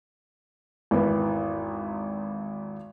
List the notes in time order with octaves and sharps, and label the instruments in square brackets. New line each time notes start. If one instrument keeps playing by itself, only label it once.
[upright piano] G#1 E2 E4 B4